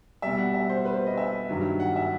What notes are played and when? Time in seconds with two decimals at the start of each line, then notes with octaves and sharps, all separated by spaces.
0.22 B2 G3 E5
0.38 F#5
0.54 E5
0.70 C5
0.85 B4
0.96 C5
1.06 D#5
1.17 E5
1.49 G2 D#3 F#3
1.80 F#5
1.96 E5